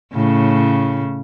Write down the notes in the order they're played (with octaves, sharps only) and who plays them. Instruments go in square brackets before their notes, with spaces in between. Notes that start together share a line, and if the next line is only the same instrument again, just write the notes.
[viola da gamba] A2 C#3